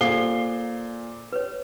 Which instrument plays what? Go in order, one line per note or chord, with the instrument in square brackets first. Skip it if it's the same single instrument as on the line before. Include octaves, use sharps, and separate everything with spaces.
[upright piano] A#2 C7 G7 [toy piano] A4 C5 F5
[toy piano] B4 C#5